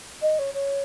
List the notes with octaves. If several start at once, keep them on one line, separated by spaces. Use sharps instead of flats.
D#5
C#5
C#5